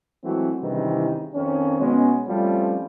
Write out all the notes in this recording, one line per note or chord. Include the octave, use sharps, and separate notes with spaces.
E3 F#3 G#3 A3 C4 F#4
C#2 G2 C3 D#3 E3
F2 D#3 C4 C#4
B2 G#3 B3 C#4
F3 G3 A3 C4 C#4 F4